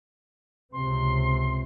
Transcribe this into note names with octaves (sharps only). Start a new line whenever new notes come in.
C#2 C3 C4 C6